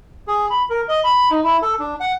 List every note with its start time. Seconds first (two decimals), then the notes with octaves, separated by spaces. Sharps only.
0.27 G#4
0.50 B5
0.70 A#4
0.89 D#5
1.04 B5
1.30 D#4
1.44 E4
1.62 A4
1.79 D4
2.00 F#5